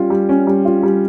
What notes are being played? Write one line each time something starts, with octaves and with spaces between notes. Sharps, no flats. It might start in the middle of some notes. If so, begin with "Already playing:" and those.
Already playing: G3 C#4 F4
G3
C#4
G3
F4
G3